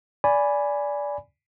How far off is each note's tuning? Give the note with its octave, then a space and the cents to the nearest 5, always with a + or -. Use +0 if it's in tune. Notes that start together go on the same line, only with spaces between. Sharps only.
D5 -15 G#5 +0 B5 +0